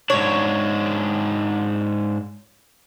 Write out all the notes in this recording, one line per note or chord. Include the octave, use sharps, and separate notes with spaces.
G#2 D4 C#5